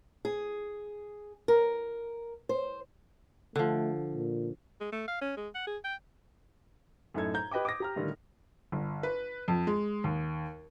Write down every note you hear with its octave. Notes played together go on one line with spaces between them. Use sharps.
G#4
A#4
C5
D3 F3 A3
A#2
G#3
A3
F5
C#4
G#3
F#5
G#4
G5
F#2 A2 D#4 A4 G#6
A#5 G6
G4 B4 D#5 G5 D6
D6 D#6 A#6
G4 A#5 F6
A2 D3 D#3 G3
G1
B4
F2
G#3
D#2